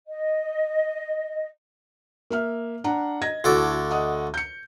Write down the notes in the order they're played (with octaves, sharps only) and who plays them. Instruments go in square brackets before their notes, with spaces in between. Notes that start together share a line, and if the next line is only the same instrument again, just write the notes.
[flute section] D#5
[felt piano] A#3 E5 F6
D4 F#5 A#5
D#5 G#6 A#6
[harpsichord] D2 A4 D5 [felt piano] E4 F#4
[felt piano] D#5 F#5 D#6
G6 C#7